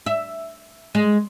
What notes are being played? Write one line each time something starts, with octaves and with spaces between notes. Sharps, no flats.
E5
G#3